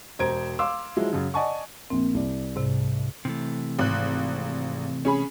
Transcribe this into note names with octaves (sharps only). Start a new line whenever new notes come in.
E1 C5 A#5 G#6 D7
F5 C6 D6 E6
F3 F#3 G#3 E4
F#2 C#3 F#3
D5 D#5 F#5 G#5 A5 C#6
A#1 A#3 C4
C2 D5
G#2 C3
C3 E3 A3
G#1 F#6
C#4 G#4 B5